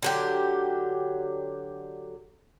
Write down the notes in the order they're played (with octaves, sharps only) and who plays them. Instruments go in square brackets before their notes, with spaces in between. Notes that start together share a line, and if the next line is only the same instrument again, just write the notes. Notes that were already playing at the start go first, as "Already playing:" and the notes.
[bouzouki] D3 F#3 G4